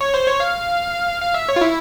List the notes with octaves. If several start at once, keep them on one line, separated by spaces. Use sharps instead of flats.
C#5
C5
C#5
F5
F5
E5
C#5
F4
E4